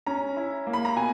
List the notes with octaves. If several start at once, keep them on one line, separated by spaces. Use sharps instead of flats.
C#4 A#5
E4
A#3
B5
A#5
B2 G#5